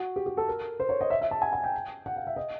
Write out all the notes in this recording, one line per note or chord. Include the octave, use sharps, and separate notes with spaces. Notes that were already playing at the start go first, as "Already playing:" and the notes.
Already playing: F#4
G4
G4
A4
A#4
C5
C#5
D#5
E5
E5
A5
G#5
G#5
G5
F#5
F5
E5
D#5